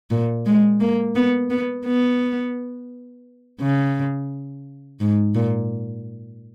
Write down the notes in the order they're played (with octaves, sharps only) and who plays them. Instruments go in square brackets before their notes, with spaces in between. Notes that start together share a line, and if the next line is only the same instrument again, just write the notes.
[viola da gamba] A#2
G#3
A#3
B3
B3
B3
C#3
G#2
A#2